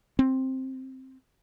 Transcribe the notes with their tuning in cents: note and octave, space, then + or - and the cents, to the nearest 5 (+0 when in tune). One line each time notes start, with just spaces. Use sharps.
C4 +5